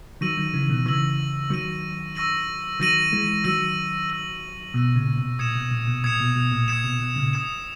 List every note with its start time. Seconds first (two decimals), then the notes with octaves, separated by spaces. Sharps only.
0.21 D#3 F#3 C#6 E6 A#6 D#7 F#7
0.37 D#3 F#3
0.54 C#3 E3
0.69 B2 D#3
0.86 C#3 E3 C#6 E6 A#6 D#7 F#7
1.50 D#3 F#3 C#6 E6 A#6 D#7 F#7
2.15 C#6 E6 A#6 D#7 F#7
2.80 D#3 F#3 E6 A#6 D#7 F#7
3.12 E3 G#3
3.44 D#3 F#3 E6 A#6 D#7 F#7
4.10 E6 A#6 D#7 F#7
4.74 B2 E6 A#6 D#7 F#7
4.95 A#2 C#3
5.18 B2
5.39 A#2 D#6 G#6 C#7 E7
5.55 B2
5.71 A#2
5.87 B2
6.04 A#2 D#6 G#6 C#7 E7
6.20 B2
6.36 B2
6.52 A#2
6.68 A#2 D#6 G#6 C#7 E7
6.84 B2
7.00 B2
7.16 A#2 C#3
7.33 D#6 G#6 C#7 E7